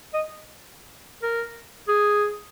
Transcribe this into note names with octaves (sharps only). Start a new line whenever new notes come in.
D#5
A#4
G#4